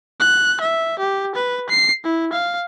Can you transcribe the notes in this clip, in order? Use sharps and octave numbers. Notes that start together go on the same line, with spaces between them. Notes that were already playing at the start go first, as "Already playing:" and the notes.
F#6
E5
G4
B4
C7
E4
F5